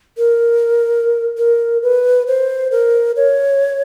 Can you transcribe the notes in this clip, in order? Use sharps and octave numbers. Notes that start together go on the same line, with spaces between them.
A#4
A#4
B4
C5
A#4
C#5